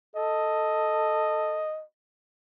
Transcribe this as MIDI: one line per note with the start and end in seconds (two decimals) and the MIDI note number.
0.16 1.67 69
0.16 1.83 75